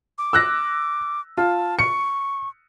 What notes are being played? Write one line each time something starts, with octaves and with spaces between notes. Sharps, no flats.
D6
E6 F#6 A#6
F4 A5
C#6 C#7